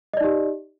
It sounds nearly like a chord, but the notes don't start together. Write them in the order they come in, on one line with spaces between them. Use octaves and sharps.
D#5 D5 D#4 G4